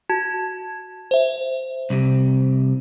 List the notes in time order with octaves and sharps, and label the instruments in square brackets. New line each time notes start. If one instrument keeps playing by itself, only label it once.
[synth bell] F#4 A5 G#6
C5 E5
[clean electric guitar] C2 C3